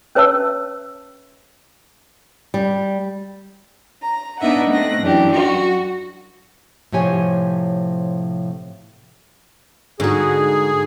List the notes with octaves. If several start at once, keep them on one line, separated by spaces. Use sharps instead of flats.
C#4 B4 C#5 E5 A5 E6
G3
A#5
B3 D4 D#4 D#5 E5 F#5
A3 C4 F#6 A#6
F#2 E3 D4 G4
F#3 F#4
A2 C3 F3 G4 C#5 G#5
G#2 D3 F#4 G#4